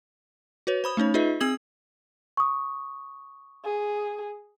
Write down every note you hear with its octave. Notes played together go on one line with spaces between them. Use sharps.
F#4 B4 C#5
C5 B5 D#6
A3 C#4 D#4 C#5
D#4 F4 G#4 B4 D#5 E5
C4 G#4 D#6 G#6 F#7
C#6 D#6
G#4